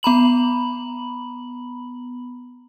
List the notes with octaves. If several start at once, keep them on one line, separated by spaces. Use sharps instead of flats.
B3 A#5 B5 F#7